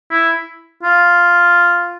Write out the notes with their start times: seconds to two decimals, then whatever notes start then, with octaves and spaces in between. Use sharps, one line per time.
0.11 E4
0.83 F4